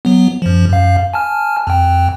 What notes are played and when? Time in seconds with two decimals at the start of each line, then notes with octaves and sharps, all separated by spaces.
0.05 F#3 B3
0.42 F#2 F3
0.69 F#2 F5
1.14 G#5 A5 F6
1.67 F2 G5